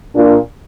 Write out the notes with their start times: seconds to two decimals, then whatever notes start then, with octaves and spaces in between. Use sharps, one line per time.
0.13 A#2 A#3 D4 F4